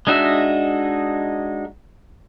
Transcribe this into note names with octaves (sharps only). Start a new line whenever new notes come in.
G#3 D4 D#4 F#4 E5